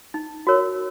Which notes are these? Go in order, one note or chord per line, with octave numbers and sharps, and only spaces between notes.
D#4
F#4 A#4 C#5